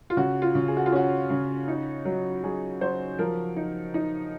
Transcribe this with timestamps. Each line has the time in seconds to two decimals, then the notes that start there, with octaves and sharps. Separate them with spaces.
0.10 F4
0.17 C#3 F#4
0.42 F4
0.55 C#3
0.68 G#4
0.77 F#4
0.86 F4
0.92 C#4 F#4
1.30 C#3
1.68 D#4
2.05 F#3
2.44 F#3 G#4
2.81 F#3 C5
3.19 F3 A#4
3.56 D#4
3.94 D#4